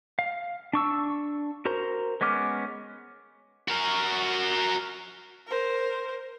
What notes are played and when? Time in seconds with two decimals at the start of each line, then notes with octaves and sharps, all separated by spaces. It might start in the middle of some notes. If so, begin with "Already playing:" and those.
0.19 F5
0.73 D4 C#6 E6
1.65 F#4 A#4 C5 A#5
2.21 G#3 B3 C#4 D6 F6
3.68 F#4 A#4
5.47 A#4 C5